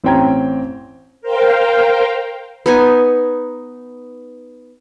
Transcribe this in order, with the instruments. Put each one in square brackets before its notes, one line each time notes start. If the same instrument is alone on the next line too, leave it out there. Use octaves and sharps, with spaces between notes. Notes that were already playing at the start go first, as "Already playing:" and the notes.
[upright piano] A1 C4 C#4 G5 A#5 G#6
[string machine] A#4 C5 F5 G5
[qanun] B3 D#4 G#5